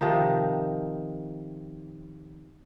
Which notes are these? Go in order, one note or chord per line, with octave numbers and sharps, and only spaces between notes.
C3 D#3 F3 D#4